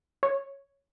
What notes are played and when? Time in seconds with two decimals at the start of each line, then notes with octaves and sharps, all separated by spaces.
0.23 C#5